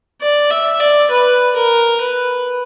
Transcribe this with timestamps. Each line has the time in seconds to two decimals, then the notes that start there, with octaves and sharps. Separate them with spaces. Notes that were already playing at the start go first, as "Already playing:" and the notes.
0.21 D5
0.51 E5
0.81 D5
1.11 B4
1.56 A#4
2.01 B4